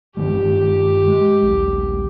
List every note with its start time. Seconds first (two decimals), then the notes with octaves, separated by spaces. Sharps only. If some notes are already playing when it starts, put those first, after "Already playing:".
0.17 G2 D#3 G#3 G4
1.08 G#3
1.42 A#1 D#2